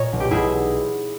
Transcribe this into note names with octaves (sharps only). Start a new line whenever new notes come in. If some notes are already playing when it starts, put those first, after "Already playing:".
Already playing: A#2 C#5 D#5
B1
G4
B1 E4 G#4